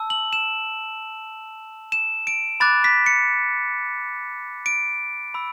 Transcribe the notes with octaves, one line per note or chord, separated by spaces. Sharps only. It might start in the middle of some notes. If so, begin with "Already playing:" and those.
Already playing: A5 E6
F#7
E7
E7
D7
B5 D6 F#6 A6
B6
C#7
D7
B5 E6